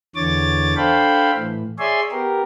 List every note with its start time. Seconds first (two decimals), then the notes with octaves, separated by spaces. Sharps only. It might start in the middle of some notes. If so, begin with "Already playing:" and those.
0.16 E2 D3 E3 C#5 D6 A6
0.77 D4 A4 C5 F5 G5 B5
1.37 A2 E3
1.79 G#4 C#5 D5 E5 G#5 C6
2.12 B3 G4 A#4